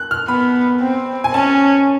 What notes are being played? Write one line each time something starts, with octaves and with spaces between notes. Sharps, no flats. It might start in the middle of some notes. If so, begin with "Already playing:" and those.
Already playing: F#6
F6
B3 B5
C4
G#5
C#4 A5